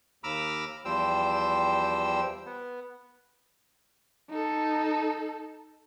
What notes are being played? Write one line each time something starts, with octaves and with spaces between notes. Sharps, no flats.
D#2 A#5 B5 D6 E6 F6
E2 F3 G3 C5 G5 E6
B3
D#4 A4